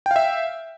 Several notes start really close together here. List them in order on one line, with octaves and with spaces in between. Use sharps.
G5 F5 E5